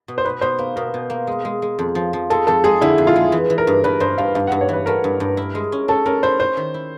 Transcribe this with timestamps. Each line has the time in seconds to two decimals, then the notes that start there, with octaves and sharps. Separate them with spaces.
0.08 B2
0.18 C5
0.25 B2 B4
0.41 B2 C5
0.59 A#3 B4
0.76 B2 A#4
0.94 B2
1.10 A#3
1.27 G#3
1.45 G#3
1.62 G#3
1.79 F2
1.95 F3
2.13 F3
2.30 G#3 A4
2.47 F2 A4
2.64 G#3 G#4
2.81 D3 E4
2.98 F2
3.07 F4
3.16 G#3
3.32 E3
3.50 E3
3.58 A#4
3.67 G2
3.84 G2 B4
4.00 G2 C5
4.18 G2 F5
4.35 G2 F5
4.47 F#5
4.52 G2
4.61 C#5
4.69 E3 B4
4.86 A3 A#4
5.04 G2
5.20 G2
5.37 E4
5.55 G#3
5.72 C#4
5.88 C#4 A4
6.06 C#4 A#4
6.23 E4 C5
6.40 C#4 C5
6.57 D#3
6.74 E4